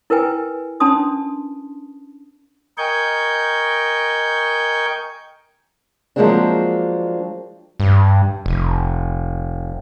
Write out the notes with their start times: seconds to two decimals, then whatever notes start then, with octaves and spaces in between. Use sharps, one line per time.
0.10 E4 A#4 B4 G5 G#5
0.80 C#4 D4 A5 C6 D#6
2.78 A#4 D#5 G5 G#5 C#6 G6
6.16 F3 F#3 G#3 A#3 C4 D4
7.80 G2
8.46 F1